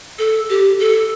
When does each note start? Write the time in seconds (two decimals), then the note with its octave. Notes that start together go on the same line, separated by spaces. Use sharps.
0.19 A4
0.49 G4
0.80 A4